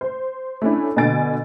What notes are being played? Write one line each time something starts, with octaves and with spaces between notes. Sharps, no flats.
C5
A3 C#4 D4 E4
B2 D3 G#5 A6 D7